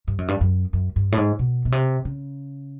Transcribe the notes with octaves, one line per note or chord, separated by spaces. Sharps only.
G2
F#2
G2
F#2
F#2
G2
A2
G#2
B2
B2
C3
C#3